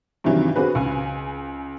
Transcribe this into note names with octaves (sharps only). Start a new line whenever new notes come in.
G2 C3 D#3 E3 F#3 G3
C4 D4 F#4 G#4 B4
C#2 G#5